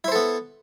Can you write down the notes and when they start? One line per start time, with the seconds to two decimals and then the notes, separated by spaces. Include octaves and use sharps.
0.04 E4
0.08 C5
0.12 A4
0.16 B3